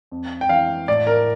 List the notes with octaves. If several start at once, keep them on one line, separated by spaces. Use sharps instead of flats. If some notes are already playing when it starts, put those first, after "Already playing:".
F2
G5
E3 F5
A2 D5
A#4